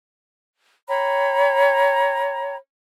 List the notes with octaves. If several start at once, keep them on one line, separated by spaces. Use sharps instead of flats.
C#5 G5 A#5 B5